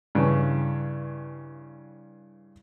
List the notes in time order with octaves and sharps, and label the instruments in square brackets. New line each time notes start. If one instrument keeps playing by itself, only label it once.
[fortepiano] G2 C#3 E3